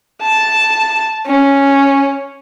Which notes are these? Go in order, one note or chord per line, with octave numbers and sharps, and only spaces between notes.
A5
C#4